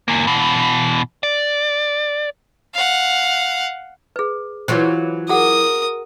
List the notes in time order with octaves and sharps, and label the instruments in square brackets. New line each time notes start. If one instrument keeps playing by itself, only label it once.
[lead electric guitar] E2 A#3
B2 E3
D5
[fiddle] F5 F#5
[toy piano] G#4 B4
[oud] E3 F#3 F4 [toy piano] C5 C#5
[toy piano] F#4 G#4 F#5 [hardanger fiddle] A#4 D#6